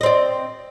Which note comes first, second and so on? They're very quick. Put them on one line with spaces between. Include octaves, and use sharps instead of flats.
D#5 C4 D5